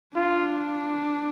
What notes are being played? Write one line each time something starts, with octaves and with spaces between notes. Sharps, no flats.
D4 F4